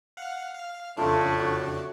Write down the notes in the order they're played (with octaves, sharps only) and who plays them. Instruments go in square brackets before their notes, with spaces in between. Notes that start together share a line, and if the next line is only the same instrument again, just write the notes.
[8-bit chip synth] F5 F#5
F5
[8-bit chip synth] F2 C#3 D4 [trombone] A2 [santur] A3 F4
[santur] F#4 C#5